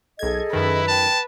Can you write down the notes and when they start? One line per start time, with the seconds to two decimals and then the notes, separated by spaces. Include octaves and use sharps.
0.19 B1 G#4 A4 D#5 G#6
0.53 F#2 D#3 E4 B4
0.88 G5 A5